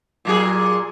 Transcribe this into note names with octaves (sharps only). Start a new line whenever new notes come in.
A#2 F#3 G#4